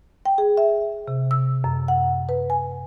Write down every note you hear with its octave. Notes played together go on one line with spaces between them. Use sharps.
G5
G#4
E5
C3
E6
F#2
F#5
B4
G#5